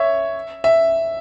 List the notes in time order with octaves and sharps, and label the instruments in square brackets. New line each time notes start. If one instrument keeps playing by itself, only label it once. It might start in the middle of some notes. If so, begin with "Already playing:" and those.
Already playing: [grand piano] C#5 E5
E5